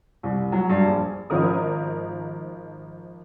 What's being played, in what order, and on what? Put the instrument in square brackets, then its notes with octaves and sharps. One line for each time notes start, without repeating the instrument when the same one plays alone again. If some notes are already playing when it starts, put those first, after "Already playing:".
[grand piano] C2
F#3
G2
A#1
[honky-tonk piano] G#1 F3 D#4 A#4 D#6